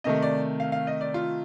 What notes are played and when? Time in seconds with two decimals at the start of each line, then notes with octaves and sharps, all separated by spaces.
0.04 C3 D#3 A3 D#5
0.22 D5
0.60 F5
0.72 F5
0.87 D#5
1.01 D5
1.14 F4